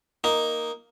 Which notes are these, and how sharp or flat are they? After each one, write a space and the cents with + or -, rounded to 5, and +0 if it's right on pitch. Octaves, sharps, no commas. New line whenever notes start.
A#3 +0 D#4 +0